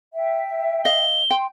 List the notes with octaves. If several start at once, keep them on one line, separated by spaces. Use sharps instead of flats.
E5 G5
D#5 F5 G7
G5 C6